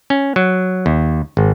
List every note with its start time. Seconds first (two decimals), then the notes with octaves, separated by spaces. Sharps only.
0.10 C#4
0.36 F#3
0.86 D#2
1.37 G#1